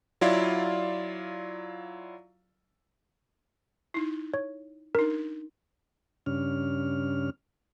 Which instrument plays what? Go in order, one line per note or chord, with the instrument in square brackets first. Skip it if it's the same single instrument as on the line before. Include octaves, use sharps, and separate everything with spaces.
[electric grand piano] F#3 E4 F4 D5 F5
[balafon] D#4 E4
[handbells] C#5
[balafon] D4 D#4 [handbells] A#4
[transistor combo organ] G2 C#3 C#4 D4 F6